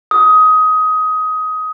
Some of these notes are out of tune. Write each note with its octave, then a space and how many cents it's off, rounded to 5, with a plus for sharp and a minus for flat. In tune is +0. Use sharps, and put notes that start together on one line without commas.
D#6 +20